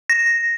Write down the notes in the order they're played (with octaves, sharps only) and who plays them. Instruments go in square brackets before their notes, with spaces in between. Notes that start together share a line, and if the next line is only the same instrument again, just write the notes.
[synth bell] A#6